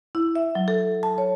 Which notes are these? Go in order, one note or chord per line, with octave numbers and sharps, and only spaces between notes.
E4
E5
F#3
A4
A5
C#5